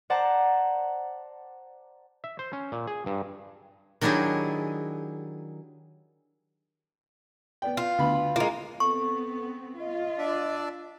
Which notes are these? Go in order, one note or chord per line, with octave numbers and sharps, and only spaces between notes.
C5 D5 F#5 A5 A#5
E5
C5
C#4
A#2
G#4
G2
D#3 F#3 D4 E4 G4 G#4
B3 D5 G5
F4
D2 B3 B5
G#3 A#3 F4
B3 C4 A4 C#6
F4 D#5
D4 D5 E5